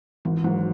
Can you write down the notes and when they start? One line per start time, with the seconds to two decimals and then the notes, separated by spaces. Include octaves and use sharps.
0.25 G#1 E3
0.44 G#2 D#3 F#3